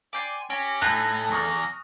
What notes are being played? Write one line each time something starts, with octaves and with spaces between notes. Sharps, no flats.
D5 G5 G#5 C6
C#4 G4 A#6
A2 A3 D#4 G#5 F#6 G6 C7
E2 C#6 D#6 F6 A#6